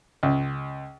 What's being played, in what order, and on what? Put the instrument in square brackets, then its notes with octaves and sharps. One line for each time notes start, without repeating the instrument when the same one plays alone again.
[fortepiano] C#2